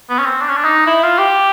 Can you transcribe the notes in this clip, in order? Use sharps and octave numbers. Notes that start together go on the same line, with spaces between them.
B3
C#4
C4
D4
C#4
D4
D#4
E4
F4
G4